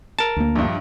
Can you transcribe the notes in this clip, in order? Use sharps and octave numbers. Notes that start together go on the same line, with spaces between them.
A#4 A5
D2 A#3
A#1 G2